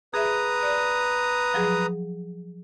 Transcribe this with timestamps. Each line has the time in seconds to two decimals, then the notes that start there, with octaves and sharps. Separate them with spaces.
0.14 G#4 B4 E5 A#5 D#6
0.63 D5 F#6
1.54 F3 F#3 G#4